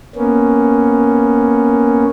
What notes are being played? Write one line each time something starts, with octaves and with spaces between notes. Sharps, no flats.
A#3 B3 C#4